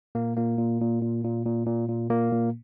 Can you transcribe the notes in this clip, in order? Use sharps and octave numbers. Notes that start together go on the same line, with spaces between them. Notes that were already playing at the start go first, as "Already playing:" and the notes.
A#2 A#3
A#2 A#3
A#2
A#2
A#2
A#2
A#2
A#2
A#2
A#2 A#3
A#2